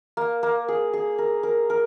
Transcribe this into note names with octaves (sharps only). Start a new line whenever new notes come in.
A#3
A#3
G#4
G#4
A#4
A#4
A#4